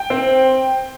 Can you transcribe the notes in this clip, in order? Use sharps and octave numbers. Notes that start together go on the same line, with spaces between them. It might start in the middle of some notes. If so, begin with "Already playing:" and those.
Already playing: G5
C4